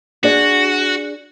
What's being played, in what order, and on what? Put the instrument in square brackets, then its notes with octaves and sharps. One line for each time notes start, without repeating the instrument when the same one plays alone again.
[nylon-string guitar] D4 G#4 D5 [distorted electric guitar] F#4